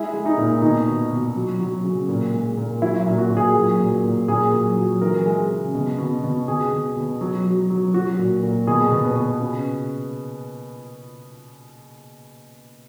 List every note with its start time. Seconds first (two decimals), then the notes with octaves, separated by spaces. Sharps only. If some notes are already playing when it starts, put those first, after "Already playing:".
Already playing: G#3 E4
0.14 G#3
0.26 D#4
0.38 A#2
0.62 B2 D#4
0.87 B2
1.11 B2
1.36 F#3
1.59 F#3
1.84 C#3
2.09 A#2
2.33 G#3
2.57 A#2
2.82 F#3 E4
3.06 A#2
3.18 F#4
3.31 A#2
3.37 G#4
3.55 F#3
3.79 A#2
4.04 A#2
4.28 A#2 G#4
4.53 F#3
4.77 F#3
5.01 E3 A#4
5.26 G#3
5.50 C#3
5.75 B2
5.98 B2
6.24 B2
6.48 B2 G#4
6.72 B2
6.97 B2
7.21 F#3
7.45 F#3
7.70 F#3
7.94 F#3 F#4
8.19 A#2
8.43 A#2
8.67 B2 G#4
8.92 B2
9.04 B4
9.16 B2
9.41 C#3